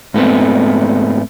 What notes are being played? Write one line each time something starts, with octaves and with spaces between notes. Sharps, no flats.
G#2 A3 B3 C4